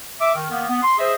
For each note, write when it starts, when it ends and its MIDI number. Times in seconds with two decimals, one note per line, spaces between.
0.21 0.33 76
0.21 0.33 86
0.35 0.49 51
0.50 0.67 51
0.50 0.67 58
0.50 0.67 59
0.69 0.80 59
0.83 0.98 84
0.98 1.14 68
0.98 1.14 72
0.98 1.14 75
0.98 1.14 76